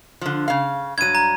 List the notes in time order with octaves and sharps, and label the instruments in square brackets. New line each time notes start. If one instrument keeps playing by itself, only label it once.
[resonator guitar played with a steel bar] D3 F3
C#3 F5
[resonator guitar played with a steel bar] G2 F#3 [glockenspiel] G#6 D#7
[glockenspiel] A#5